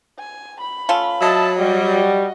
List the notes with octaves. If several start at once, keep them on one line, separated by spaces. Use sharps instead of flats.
G#5
B5
A3 C#4 F4
F#3 D#5 E5 A5
G3 F#4 D#5